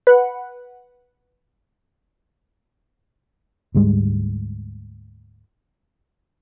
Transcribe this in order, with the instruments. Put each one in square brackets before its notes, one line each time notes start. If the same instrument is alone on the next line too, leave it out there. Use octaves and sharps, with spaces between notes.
[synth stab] B4 F#5
[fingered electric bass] D2 G#2 G3 G#3